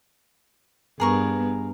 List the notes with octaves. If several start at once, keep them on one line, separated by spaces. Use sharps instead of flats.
G2 B3 G#4 A#4 C#6